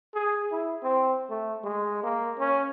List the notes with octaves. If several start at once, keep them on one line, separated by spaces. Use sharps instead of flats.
G#4
E4
C4
A3
G#3
A#3
C#4